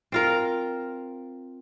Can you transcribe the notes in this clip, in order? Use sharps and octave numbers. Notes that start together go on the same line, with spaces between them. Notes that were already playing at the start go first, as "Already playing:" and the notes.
C4 F4 A#4